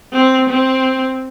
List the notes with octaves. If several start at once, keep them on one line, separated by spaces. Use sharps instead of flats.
C4
C4